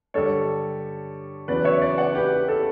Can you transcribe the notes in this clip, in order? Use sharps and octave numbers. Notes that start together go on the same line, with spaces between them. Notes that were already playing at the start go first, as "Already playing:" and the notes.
G2 D3 G3 A4 C#5
E2 C#3 F#3 B4 D5
C#5 E5
B4 D5
D5 F#5
G4 B4
G4
A4